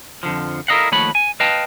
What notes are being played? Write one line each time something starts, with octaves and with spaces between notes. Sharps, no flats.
F2 D3 F3
E4 A4 A#4 D#5 F5 F#5
D#2 F3 A3 C#5 F#5 B5
G#5
B4 D#5 F5 G5 A5